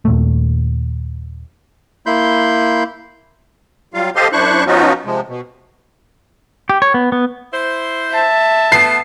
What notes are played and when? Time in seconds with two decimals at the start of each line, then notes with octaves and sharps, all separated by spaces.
0.05 D#2 A#2 A3
2.06 A#3 E4 B5 C6 G6
3.94 F#3 G3 F4 F5
4.16 G4 A4 C5 D#5 F5 C6
4.32 F#2 D4 E4 C5 C#6 F#6
4.67 F3 B3 C#4 D#4 F4 F#4
5.05 C3 F3 G#3
5.28 B2
6.70 G4
6.82 C#5
6.94 B3
7.12 B3
7.53 E4 C5
8.11 E5 A5
8.72 A3 B3 C7